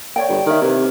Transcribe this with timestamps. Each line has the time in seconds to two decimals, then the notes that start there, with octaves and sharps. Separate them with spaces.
0.16 C#5 D5 G5
0.29 G1
0.46 D#3 A#4 C#5 E5
0.62 C3 E4 B4